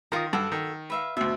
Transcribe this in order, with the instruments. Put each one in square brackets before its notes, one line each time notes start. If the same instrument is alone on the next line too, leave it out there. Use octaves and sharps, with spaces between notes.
[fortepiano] D#3 D#6 [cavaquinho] F4 A#4
[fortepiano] G2 [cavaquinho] F#4 A4 F#5
[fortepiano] D#3
[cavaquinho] B4 E5 F5
[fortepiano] D2 B2 [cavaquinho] E5